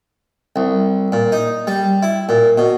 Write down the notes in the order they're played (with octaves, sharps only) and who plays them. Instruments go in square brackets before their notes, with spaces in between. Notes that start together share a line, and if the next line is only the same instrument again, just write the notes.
[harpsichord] C2
A#2
D#4
G3
E4
A#2
B2